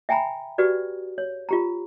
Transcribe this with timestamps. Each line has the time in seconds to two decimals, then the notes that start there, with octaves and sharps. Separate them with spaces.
0.09 E5 G5 G#5 A#5 B5
0.58 F#4 G4 B4 D5
1.18 C#5
1.49 F4 G4 A#5